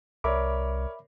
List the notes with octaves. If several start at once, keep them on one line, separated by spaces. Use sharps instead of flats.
C2 A#4 C#5 D5 E5 B5 D6